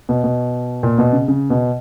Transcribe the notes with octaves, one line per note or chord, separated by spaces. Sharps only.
B2
B2
A#2
B2
C#3
C#3
B2